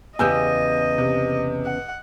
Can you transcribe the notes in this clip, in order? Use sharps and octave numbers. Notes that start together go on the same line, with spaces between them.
E2 C#3 G4 D#5 G#5 E6 G6
C3
F#5